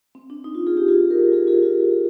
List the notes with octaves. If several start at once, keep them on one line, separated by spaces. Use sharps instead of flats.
C4
D4
D#4
F4
F4 G#4
D#4 G4
F4 G#4
G4 A#4
F4 G#4
F4 G#4
F4